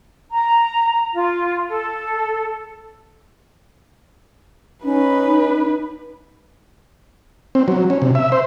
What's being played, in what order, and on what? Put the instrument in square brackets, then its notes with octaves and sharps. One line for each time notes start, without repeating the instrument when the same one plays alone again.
[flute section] A#5
F4
A4
[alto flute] C#4 [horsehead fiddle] D#4 B4
[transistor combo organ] C4
F#3
C#4
C3
E5
C5